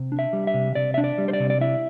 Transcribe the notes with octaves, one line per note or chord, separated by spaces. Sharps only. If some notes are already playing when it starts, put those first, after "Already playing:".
Already playing: C3
D4
E5
G3
E5
C3
C3 D5
D4 E5
D5
G3
C5
D5
C3
D5
E4 E5